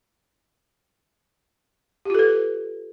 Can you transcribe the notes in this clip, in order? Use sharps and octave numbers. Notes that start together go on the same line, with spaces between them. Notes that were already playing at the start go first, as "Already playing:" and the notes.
F4 G4 A4 B4